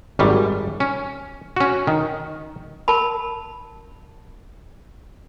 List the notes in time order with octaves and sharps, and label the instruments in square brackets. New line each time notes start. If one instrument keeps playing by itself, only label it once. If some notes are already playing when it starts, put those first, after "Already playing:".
[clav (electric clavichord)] G#1 F#2 G3
C#4
C#4 F#4
D#3
[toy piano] A#4 A5 B5